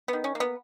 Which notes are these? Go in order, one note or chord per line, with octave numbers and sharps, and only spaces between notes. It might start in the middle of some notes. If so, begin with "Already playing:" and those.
D#3 B3
C#4
A#3
B3